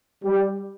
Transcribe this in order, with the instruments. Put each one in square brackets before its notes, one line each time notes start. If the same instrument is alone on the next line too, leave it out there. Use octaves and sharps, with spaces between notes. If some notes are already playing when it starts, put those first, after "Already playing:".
[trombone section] G3